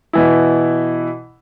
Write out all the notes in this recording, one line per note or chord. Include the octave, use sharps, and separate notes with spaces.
B2 E3 E4